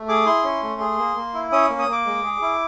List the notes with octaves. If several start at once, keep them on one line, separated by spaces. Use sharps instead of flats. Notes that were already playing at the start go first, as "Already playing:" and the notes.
Already playing: A3
G#4 D6
E4 C6
C#4
A3
G#4
A#3
A#3
E4
C#4 D#6
A#3
D#6
A#3 D6
G#3
G#4
E4